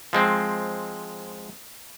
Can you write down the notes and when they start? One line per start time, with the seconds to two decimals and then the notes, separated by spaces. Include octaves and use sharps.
0.13 F3 G#3 C4